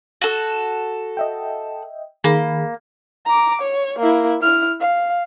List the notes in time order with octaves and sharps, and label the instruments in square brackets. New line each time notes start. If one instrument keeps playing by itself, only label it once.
[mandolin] F#4 A4
[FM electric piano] D#5 E5 G5
[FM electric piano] D#3 G#4 B5 [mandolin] A#3
[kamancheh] A#5 D6
C#5
A#3 E4
E4 F6
F5